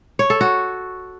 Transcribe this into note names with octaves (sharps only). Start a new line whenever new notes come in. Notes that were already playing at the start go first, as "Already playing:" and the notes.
C#5
A4
F#4